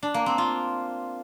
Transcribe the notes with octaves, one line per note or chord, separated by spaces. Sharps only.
D4
A#3
C4
F4